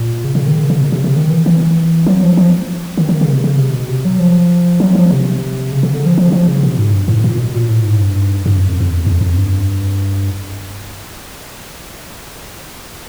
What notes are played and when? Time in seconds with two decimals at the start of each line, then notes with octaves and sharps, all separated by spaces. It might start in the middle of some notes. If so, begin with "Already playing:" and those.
Already playing: A#2
0.24 C#3
0.35 C#3
0.47 D#3
0.59 C#3
0.70 C#3
0.81 B2
0.87 C#3
0.92 C3
1.04 C3
1.16 D#3
1.30 E3
1.46 E3
2.07 F#3
2.22 F3
2.37 F3
2.98 D#3
3.09 D#3
3.21 C#3
3.33 C3
3.44 C#3
3.59 C3
3.73 B2
3.89 C3
4.05 F#3
4.19 F3
4.80 F#3
4.95 F3
5.11 C3
5.71 C#3
5.83 C#3
5.94 D3
6.06 F3
6.18 F3
6.32 F3
6.48 C#3
6.63 B2
6.78 G#2
6.93 G2
7.08 A2
7.24 A#2
7.39 B2
7.55 A#2
7.69 A2
7.84 G#2
8.00 G2
8.46 G2
8.56 F#2
8.68 F2
8.80 F2
8.91 E2
9.06 F2
9.21 F2
9.37 G2